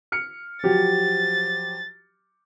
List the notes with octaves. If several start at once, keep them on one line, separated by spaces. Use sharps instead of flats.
F6 C#7
F3 F#3 G4 A6